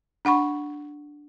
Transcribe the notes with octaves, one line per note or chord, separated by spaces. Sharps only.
D4 F#5 B5 C#6